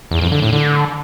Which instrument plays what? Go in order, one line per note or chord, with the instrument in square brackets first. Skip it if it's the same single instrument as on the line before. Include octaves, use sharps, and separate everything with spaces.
[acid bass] E2
F2
D3
A2
D3